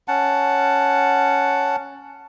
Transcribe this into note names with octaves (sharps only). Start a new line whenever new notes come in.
C#4 F#5 A5